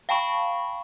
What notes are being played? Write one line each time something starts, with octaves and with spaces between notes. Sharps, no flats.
F5 G5 A5 B5 C#6